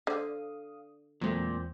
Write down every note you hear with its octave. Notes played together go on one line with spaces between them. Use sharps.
D3 C5 D5 F5 D#6
E2 A#2 F#3 G#3 A3 C4 G6